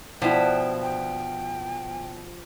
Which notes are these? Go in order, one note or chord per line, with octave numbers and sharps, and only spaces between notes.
B2 F3 D4 E4 G5
G5